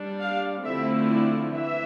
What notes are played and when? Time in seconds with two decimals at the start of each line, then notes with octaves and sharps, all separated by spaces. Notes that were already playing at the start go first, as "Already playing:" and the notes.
Already playing: G3 D4
0.21 F5
0.65 D3 F3 A3 C4 E4 E5
1.10 D5
1.54 E3 E5